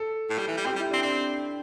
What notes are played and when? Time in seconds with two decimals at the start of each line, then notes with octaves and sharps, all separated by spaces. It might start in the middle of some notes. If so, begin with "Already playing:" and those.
Already playing: A4
0.30 A2
0.38 G3
0.48 E3
0.57 G3
0.66 C4 G4
0.76 G3
0.79 E4
0.91 C4 D4
1.03 C4 D4